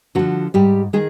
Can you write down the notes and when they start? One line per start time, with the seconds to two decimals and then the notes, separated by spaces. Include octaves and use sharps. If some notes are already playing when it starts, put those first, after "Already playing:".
0.15 D3 F#3 F#4
0.19 F3
0.54 G#2 G3 G4
0.93 D#3 G#3 G#4